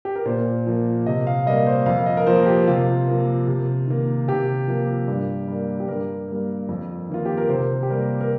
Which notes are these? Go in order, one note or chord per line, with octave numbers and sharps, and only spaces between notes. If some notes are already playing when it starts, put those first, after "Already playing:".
G4
A#4
A#2 C5
F3 A#3
C3 D#5
F5
G3 A#3 D#5
C5
F2 F5
D#5
A#4
F3 A#3 C5
G4
C3 F4
F3 A#3
C3
D#3 A#3
C3 G4
F3 A#3
G2
G3 A#3
G4
G2 A#4
G3 A#3
F2
D#3 A#3 F4
G4
A#4
C3 C5
G4
G3 A#3 A#4
A#4